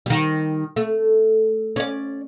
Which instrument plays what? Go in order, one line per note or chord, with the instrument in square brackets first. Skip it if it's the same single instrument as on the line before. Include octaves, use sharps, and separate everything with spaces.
[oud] D#3 G3
A3
C#4 D5